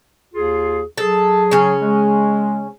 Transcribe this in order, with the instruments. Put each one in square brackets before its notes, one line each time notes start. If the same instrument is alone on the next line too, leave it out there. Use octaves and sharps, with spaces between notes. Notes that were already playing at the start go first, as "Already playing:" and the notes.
[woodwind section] D#2 F4 G#4
[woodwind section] F#3 G#4 [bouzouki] A4
[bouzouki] C#3 C#4
[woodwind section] G#3